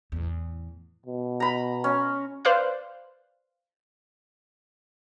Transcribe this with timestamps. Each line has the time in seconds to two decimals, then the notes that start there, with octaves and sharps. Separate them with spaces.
0.12 E2 A2
1.06 B2
1.40 A#5 B5
1.84 C#4
2.45 B4 C5 D5 F5 F#6